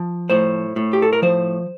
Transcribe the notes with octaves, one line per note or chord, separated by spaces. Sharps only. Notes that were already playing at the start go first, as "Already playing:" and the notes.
Already playing: F3
A2 C5
A2
G4
A4
A#4
F3 C5